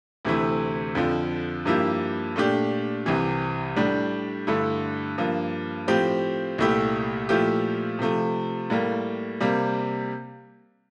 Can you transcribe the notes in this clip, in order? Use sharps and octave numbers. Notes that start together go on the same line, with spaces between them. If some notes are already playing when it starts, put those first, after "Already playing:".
D2 C3 E3 A3 E4
F2 D3 F3
G2 F3 A#3 E4 G4
A#2 A3 D4 G4
C2 C3 E3
A2 G3 D4
G2 D3 A3 E4
G2 F3 A#3
A2 F3 C4 G4
C2 A#2 A3 E4 G4
A#2 F3 A3 E4 G4
C3 F3 A3
A2 G3 A#3
C3 G3 A#3